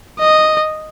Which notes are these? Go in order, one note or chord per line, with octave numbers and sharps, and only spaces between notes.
D#5